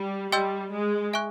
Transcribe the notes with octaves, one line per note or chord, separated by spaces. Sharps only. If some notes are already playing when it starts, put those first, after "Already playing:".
Already playing: G3
G3 D#5 G5 C6 E6 G6
G#3
E5 G#5 C#6 F#6